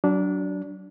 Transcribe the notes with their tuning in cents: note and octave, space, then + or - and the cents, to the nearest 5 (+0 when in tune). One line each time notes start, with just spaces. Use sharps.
F#3 +20 D4 -15